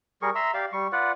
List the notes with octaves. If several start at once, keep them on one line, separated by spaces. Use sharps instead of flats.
G3 G#4 A#4 C#6
E5 A#5 C6 E6
G4 D5 F5
G3 C#6
F4 B4 D5 F#5